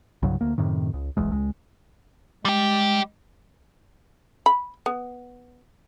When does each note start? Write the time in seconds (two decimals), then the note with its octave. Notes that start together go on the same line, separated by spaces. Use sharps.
0.23 C2 G2 C#3 F#3
0.41 D2 A#3
0.58 F#2 A2 C3 D#3
0.93 C#2
1.17 D#1 B1 E2 G#3
1.32 C#2 G#3
2.45 G3 G#3 G4
4.46 B5
4.86 B3